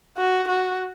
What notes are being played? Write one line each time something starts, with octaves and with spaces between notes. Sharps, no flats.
F#4
F#4